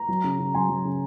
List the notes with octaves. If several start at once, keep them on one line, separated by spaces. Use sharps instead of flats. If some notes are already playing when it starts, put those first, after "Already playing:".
Already playing: A#5
F#3
C#3
C#3
F#3 G#5 C6
F#3
C#3